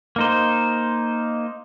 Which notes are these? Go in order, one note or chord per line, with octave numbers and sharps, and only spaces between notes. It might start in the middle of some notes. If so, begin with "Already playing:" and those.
A#3 D#4 C5